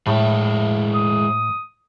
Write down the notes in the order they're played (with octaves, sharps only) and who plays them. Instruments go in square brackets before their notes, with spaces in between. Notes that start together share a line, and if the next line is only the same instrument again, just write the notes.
[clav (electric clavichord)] A2 [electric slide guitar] G#3 E4
[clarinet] D#6